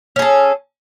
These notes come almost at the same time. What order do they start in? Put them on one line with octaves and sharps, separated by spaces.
C#4 G#4 A4